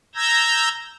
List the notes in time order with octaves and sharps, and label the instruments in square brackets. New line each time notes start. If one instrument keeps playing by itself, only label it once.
[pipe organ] A#5 E6 G6 G#6 A#6